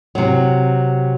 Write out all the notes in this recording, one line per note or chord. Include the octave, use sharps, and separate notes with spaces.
C3 F#3